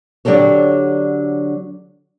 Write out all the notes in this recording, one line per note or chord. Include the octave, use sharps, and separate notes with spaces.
D3 F#3 D4 G4 A4 C#5